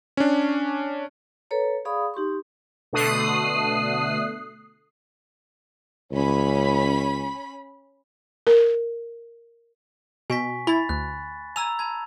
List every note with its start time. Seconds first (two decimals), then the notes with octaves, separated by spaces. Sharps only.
0.17 C#4 D4
1.51 A4 B4 C#5 A#5
1.85 G#4 D5 F5 B5 C#6 D#6
2.14 D#4 G4 C6 C#6
2.93 B2 D3 A3 D#6 F#6 C7
6.12 C#2 C#4 B5
8.47 A#4
10.30 B2 G#5 C#6 B6
10.67 E4 B5 A6
10.89 D2 F#6
11.56 G#5 A#5 E6 F7
11.79 A5 B5 G#6